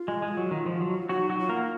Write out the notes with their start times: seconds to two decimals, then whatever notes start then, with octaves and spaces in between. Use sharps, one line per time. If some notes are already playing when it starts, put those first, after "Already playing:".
Already playing: F4
0.08 G#3
0.22 G#3
0.37 F#3
0.51 D#3
0.66 F3
0.81 F#3
1.09 F#3 D#4 F#4
1.29 F#3 F#4
1.39 F4
1.49 A#3 A#4